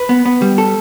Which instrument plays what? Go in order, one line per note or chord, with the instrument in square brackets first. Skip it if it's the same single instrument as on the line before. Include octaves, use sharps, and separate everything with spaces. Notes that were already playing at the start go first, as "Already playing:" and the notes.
Already playing: [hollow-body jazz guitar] B4
B3
B3
G3
A4